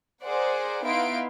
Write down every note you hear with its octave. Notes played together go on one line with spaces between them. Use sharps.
G#4 A#4 C5 D5 F#5
B3 D#4 E4 F5 C6 D7